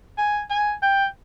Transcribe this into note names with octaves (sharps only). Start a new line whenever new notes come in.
G#5
G#5
G5